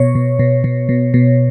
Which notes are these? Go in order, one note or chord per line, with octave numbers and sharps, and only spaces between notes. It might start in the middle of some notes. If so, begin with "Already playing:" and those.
Already playing: B2 C#5
B2
B2
B2
B2
B2